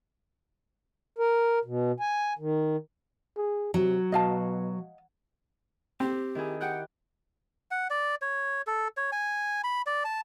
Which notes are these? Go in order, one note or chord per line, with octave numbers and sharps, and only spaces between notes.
A#4
B2
G#5
D#3
G#4
C3 F#3
B2 D#5 F5 A5
C4 G4
D#3 E4 G#4
G4 F#5 G5 F#6
F#5
D5
C#5
A4
C#5
G#5
B5
D5
A5